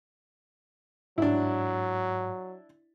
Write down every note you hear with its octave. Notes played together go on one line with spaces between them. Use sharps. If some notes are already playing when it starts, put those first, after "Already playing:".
G#2 F#3 D4 E4